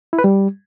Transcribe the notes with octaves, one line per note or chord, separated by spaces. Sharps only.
E4
B4
G3